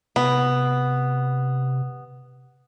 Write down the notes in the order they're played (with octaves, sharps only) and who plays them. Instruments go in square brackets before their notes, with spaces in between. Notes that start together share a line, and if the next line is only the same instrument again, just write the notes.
[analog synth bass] C3 [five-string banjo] B3